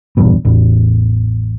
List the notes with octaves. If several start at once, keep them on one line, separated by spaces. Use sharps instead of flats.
A#1 E2 G2 B2
A1 E2